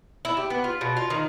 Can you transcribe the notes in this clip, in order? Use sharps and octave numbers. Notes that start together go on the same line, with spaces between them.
E4
G4
B3
F4
B2
F4
D#3